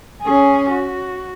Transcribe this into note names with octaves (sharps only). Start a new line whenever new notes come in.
C#4 G#4
F#4